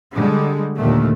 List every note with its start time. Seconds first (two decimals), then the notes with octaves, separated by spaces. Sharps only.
0.14 D3 G3 G#3
0.76 D#2 A#2 D3 D#3 A3